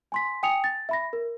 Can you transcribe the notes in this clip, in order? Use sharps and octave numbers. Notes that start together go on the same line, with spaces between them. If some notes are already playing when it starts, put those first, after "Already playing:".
G#5 C6 B6
G5 G#5 D#6 C#7 F7
A6
E5 B5 A#6
A#4